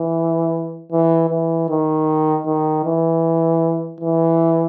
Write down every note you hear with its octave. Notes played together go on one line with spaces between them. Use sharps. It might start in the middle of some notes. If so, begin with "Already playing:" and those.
Already playing: E3
E3
E3
D#3
D#3
E3
E3